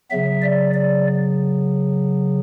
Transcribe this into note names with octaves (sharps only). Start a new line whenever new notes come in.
C#3 F#3 B3 E5
D5
D5